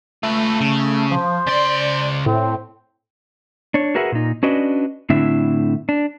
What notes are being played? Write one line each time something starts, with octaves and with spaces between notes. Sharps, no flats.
A3 F4 B4
C#3
F3 C5
C#3 D5 C6
A2 C4
D4 C#5
F#4 G#4 A#4 B4 E5 F#5
A#2 D#4
C#4 D4 F#4 B4 D5 D#5
A2 D3 C4 D4 E4 E5
D4